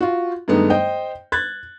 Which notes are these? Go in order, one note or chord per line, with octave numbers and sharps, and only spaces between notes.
F4 F#4
G2 D#3 G#3 A3 B3 D#4
C5 D#5 G5
F#6 G#6 A6